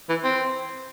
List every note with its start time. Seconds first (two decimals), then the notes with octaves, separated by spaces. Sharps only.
0.09 E3
0.24 C4